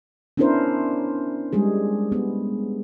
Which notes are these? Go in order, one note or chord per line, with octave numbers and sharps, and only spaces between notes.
B3 C#4 D4 E4 A#4 C5
G3 G#3 G#4
B3